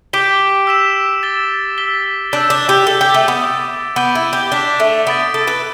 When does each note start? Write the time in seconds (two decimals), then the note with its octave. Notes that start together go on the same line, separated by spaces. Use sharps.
0.13 G4 D6 G6 B6 D7 G7
0.67 E6 B6 E7
1.23 A6 E7 G7
1.78 E6 B6 G7
2.32 D4 E6 G6 B6 E7 G7
2.50 D4
2.69 G4
2.87 A4 A6 G7
3.01 G4
3.14 A3
3.28 B3
3.43 D6 A6 D7
3.96 B3 D6 G6 D7 G7
4.15 E4
4.33 G4
4.51 D4 D6 B6 G7
4.80 A3
5.07 B3 A6 D7 G7
5.34 A4
5.47 B4